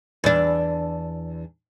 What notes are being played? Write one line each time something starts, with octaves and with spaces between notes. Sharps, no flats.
E2 D4